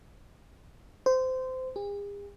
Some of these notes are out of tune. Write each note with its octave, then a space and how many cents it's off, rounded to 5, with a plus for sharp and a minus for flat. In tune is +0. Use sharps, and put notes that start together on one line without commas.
C5 -20
G#4 -45